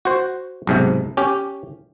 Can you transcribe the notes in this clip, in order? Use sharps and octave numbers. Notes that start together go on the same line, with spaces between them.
F#4 C5
B1 G#2 C3
C#4 G4